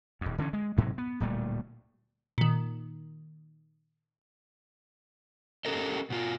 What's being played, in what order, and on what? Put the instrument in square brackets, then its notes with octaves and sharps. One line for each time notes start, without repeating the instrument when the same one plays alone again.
[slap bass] D#1 F2
D3 E3 C4 C#4
G#3
D2 G#2 C3 F#3
B3
D1 A#2 G3 A3
[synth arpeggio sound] A#2 D#3
[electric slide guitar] C#4 G4 A4 A#4 D#5
B2 F4